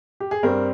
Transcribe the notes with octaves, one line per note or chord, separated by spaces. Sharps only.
G4
G#4
G2 G3 C4 A#4